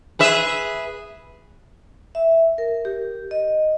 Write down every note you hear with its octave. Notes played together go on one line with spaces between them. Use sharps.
G#4 B4 E5
E5
A#4
G4
D#5